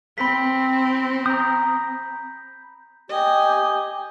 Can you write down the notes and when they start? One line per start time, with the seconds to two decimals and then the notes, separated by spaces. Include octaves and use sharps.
0.18 C4 B5 B6
1.26 A#5 D#6 G6
3.09 G4 D#5 G#5